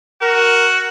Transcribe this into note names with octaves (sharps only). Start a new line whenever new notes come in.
F#4 A#4